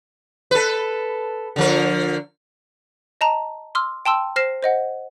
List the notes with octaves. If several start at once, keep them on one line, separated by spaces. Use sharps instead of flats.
A4 B4
D3 F3 A#4
D#5 A5 A#5
C6 D6 E6 F6
G5 A5 C6 E6
C5 F6 A#6 C7 E7
C5 D#5 F#5